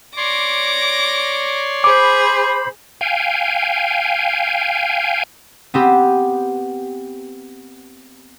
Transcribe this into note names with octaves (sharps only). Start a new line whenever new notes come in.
C#5 D5 C6 D6 A#6
G#4 C5 B5 D6
F5 G5 G#5
B3 C4 G4